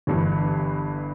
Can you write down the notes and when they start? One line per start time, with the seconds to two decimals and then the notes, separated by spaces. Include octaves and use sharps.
0.07 G1 G2 E3